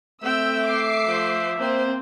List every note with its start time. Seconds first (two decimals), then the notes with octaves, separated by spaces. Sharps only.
0.23 A3 C4 E5 G5 E6
0.63 D6 C7
1.06 F3 C5
1.59 A#3 C4 C5